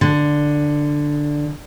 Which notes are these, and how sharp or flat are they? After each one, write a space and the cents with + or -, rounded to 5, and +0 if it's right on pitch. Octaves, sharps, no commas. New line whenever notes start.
D3 +5